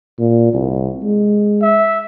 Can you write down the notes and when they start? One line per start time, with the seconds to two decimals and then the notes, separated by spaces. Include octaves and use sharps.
0.19 A#2
0.53 C2
1.03 G#3
1.62 E5